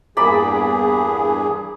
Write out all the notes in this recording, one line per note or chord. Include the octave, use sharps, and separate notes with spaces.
E2 G2 A#3 G#4 D5 B5